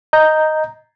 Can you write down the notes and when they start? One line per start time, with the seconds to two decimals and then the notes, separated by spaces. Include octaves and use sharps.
0.13 D#5 A#5 G6